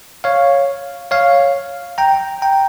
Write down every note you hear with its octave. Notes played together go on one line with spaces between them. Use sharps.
C#5 F5
C#5 F5
G5 A#5
G5 A#5